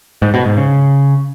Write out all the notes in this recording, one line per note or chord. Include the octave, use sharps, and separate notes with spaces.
G#2
B2
G#2
C#3